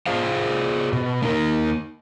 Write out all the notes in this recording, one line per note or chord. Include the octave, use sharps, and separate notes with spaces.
F4 G#4 C5 F5
B2
A#3 D#4 A#4